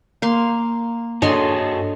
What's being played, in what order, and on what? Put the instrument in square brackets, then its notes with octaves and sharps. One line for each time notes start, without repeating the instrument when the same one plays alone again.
[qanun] A#3 F5 C6
[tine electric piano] G2 D4 [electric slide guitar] F#4 G#4 A4 [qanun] C#5 D#5 C6